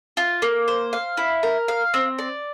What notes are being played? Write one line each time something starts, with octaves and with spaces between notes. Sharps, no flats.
F4
A#3
C5
F5
E4
A#4
F5
C4
D5